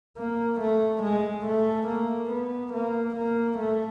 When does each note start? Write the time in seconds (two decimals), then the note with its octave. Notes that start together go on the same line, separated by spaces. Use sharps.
0.18 A#3
0.60 A3
1.03 G#3
1.46 A3
1.88 A#3
2.30 B3
2.73 A#3
3.16 A#3
3.58 A3